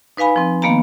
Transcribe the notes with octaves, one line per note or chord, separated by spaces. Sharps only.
D#4 B4 F5 G#5 B5
F3 C4
D#3 A#3 B3 F5 A#5